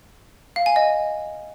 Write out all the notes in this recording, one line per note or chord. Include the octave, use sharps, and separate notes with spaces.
F5
G#5
D#5